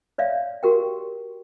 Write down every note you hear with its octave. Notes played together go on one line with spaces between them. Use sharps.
C#5 D5 E5 F5
F#4 G4 A#4 G5